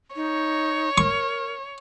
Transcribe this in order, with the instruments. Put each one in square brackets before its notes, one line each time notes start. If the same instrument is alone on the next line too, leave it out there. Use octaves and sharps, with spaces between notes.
[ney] D#4 [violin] C#5
[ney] A#4 [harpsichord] C#6